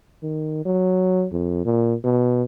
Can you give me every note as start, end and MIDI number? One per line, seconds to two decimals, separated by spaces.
0.23 0.64 51
0.65 1.25 54
1.32 1.60 41
1.65 1.94 46
2.04 2.43 47